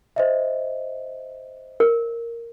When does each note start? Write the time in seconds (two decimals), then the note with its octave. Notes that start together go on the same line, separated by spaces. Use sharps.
0.16 C5 D#5 E5
1.80 A#4